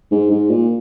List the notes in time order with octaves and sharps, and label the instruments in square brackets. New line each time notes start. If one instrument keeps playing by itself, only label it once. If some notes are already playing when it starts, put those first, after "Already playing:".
[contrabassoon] G#2
G#2
A#2